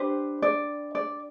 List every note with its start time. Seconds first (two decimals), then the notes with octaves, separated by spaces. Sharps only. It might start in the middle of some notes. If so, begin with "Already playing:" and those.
Already playing: D4 G4 B4 C5
0.42 D5
0.95 D5